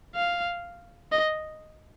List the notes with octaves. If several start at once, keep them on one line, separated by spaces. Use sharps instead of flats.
F5
D#5